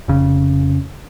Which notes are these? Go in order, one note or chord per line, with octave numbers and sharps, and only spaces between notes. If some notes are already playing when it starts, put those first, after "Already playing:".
F1 C#3